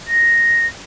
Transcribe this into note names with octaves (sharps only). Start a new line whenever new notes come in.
A#6